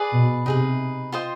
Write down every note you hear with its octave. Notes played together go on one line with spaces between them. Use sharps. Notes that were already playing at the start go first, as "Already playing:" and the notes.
Already playing: G#4 B4 D5
B2
C3 D#4 G#4 B4
F4 C5 D#5 G5